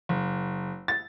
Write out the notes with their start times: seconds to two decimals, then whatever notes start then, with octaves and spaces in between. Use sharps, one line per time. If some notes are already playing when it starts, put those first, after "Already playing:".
0.09 F#1
0.88 A6